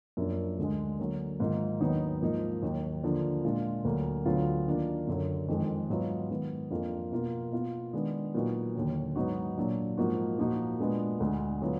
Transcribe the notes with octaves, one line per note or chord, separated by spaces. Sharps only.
F#2 F3 A#3 D4
D2 D3 G#3
D3 F#3 A#3
G#2 D#3 A#3 F4
D#2 D#3 F#3 B3 D#4
G#2 F3 A#3 D#4
D#2 D#3 F#3
D3 F3 A#3 D4
A#2 G#3 D4 F4
D2 D3 F#3 A#3
D2 D3 F#3 B3 F4
D#3 A#3 D4 F4
F#2 D3 F#3
F2 D#3 G#3
G#2 F#3 B3 F4
D#3 G#3 B3
F2 F3 A#3 D4 F4
B2 A#3 F4
B2 A#3 F4
D#3 G#3 B3 D4
A#2 F#3 B3 D#4 F#4
D#2 D3 F#3
G#2 F#3 B3 D#4 F#4
A#2 F#3 D4 F4
G#2 F3 A#3 D#4 F#4
A#2 F3 A#3 D#4 F#4
A#2 G#3 B3 D4
D2 D3 G#3
D3 F#3 B3 D4 F4